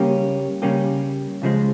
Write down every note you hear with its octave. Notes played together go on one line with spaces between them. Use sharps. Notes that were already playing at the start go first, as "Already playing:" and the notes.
Already playing: C#3 G3 A#3 C#4 G4
C#3 G3 A#3 C#4 G4
C#2 C#3 F3 G#3